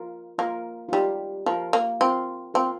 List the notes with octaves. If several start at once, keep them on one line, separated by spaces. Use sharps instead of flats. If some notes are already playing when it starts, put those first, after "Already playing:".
Already playing: F4 A#4
A#3 F4 A#4
F4
G3 D#4 G4
F3 F4 A#4
A#3
C4 F4 A#4
C4 F4 A#4